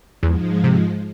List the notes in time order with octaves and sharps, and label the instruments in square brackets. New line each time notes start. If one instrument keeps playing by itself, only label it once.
[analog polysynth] E2 [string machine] G#2 F3 G#3
[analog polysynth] C3